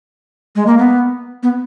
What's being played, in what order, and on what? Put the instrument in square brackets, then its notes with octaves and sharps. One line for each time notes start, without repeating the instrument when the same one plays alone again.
[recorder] G#3
A#3
B3
B3